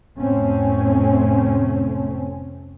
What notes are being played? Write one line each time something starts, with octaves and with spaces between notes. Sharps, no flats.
F1 A2 A3 C4 C#4